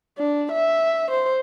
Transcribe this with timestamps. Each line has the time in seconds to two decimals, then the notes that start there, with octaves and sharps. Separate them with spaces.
0.18 D4
0.52 E5
1.11 C5